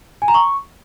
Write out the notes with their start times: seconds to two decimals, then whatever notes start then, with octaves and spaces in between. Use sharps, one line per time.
0.22 G#5
0.28 A#5
0.34 C#6